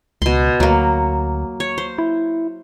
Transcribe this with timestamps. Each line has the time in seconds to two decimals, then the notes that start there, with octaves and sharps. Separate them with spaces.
0.22 C#2 B2 C6
0.60 D2 F#3 A#3
1.60 C#5
1.78 C5
1.98 E4